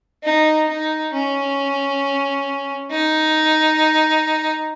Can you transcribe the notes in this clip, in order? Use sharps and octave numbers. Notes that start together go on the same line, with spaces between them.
D#4
D#4
C#4
D#4